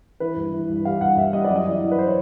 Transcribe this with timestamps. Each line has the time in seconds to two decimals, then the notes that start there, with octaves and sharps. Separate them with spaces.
0.20 E3 B4
0.36 G2
0.53 E3
0.69 G2
0.85 G3 F5
1.01 G2 F#5
1.17 G2 E5
1.33 G3 D#5
1.44 D5
1.50 F#2
1.56 D#5
1.65 E3
1.82 E3
1.91 B4
1.98 C5
2.07 C#5